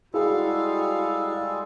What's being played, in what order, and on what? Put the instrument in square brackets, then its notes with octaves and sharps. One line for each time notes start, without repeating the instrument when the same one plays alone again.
[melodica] G3 G#3 A4 [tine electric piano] E4 G#4 [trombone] F#4 [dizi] F5